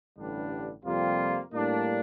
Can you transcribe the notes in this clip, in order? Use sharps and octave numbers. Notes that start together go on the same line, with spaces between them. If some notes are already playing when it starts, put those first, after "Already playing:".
A1 G2 D3 G3 D4
F2 C3 G3 A#3 F4
A2 G3 A#3 D4